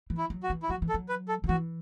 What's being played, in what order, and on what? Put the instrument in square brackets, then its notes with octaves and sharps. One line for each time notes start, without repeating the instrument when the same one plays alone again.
[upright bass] E3
[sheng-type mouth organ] E4
[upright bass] F#3
[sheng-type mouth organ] F#4
[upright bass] E3
[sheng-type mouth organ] E4
[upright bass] F#3 [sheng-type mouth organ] F#4
[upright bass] E3
[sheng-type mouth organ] A4
[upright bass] F#3
[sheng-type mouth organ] B4
A4
[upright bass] D3
[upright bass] E3 [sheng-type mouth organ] F#4